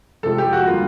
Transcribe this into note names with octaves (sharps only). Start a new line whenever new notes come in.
F2 C3 F3 G#3 A4
G4
F#4
D3 G3 A#3 F4